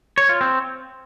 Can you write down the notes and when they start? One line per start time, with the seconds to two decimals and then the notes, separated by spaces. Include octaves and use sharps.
0.18 C#5
0.29 F4
0.41 C4